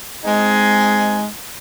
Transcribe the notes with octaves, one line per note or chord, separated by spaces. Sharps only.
G#3 C4 D#4 G#4